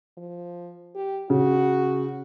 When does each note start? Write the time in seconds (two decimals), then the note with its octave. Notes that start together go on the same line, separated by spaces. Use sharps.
0.17 F3
0.95 G4
1.30 C#3 F#4